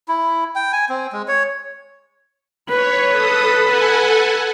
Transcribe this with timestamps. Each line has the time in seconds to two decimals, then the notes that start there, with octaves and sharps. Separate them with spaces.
0.08 E4
0.55 G5
0.73 G#5
0.89 C4
1.13 G#3
1.28 C#5
2.69 B4 C#5
3.06 A4 D#6
3.61 A4 F#5 G#5